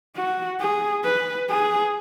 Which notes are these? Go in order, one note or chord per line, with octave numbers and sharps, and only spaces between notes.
F#4
G#4
B4
G#4